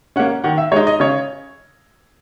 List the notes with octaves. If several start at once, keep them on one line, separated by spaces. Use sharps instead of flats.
A#3 C#4 F#5
D#3 F#5
E5
G#3 D#4 C#5
D#5
C#3 C#5